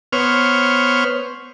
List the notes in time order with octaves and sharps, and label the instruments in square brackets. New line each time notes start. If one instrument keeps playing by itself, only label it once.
[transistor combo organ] B3 C5 C#5 F6